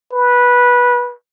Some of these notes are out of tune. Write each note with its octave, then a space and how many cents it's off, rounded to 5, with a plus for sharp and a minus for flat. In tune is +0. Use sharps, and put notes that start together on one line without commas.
B4 -15